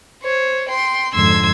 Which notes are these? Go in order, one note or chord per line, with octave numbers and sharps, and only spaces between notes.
C5 C#5
G5 C6
F2 G#2 D3 C6 E6 G#6